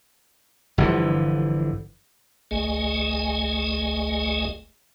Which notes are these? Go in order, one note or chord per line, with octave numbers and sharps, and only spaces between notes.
G1 D3 E3 F3
G1 C#2 A3 G#4 D#5 G#5